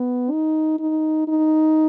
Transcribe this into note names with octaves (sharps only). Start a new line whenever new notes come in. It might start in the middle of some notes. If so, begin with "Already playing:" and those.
Already playing: B3
D#4
D#4
D#4